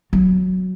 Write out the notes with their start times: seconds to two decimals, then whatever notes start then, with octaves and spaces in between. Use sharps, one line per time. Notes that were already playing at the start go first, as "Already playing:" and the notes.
0.13 F#3